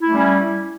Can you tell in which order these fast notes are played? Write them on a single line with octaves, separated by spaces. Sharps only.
E4 A3 G3 C#4